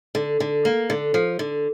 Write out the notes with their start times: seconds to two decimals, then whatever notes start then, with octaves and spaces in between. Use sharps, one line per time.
0.15 D3
0.40 D3
0.65 A#3
0.90 D3
1.14 F3
1.39 D3